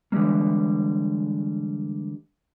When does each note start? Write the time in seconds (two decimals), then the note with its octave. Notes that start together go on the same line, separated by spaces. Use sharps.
0.12 D3 E3 G3 G#3 A#3